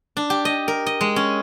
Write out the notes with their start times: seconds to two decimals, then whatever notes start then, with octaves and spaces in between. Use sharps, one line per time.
0.17 D4
0.30 G4
0.45 D#5
0.68 A#4
0.86 D#5
1.01 G#3
1.16 C#4